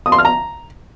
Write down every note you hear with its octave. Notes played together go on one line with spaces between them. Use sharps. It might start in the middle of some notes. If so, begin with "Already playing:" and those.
D#6
C6
F6
A#5